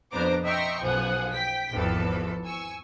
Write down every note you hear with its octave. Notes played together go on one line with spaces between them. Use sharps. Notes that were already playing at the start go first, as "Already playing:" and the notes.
F2 B3 D4 C5 A#5 D6
D#5 E5 G5 A#5 C6 C#6
B1 F#2 F3 G#4 F#5
G5 B6
G#1 E2 F3 A4
G#5 C#6 E6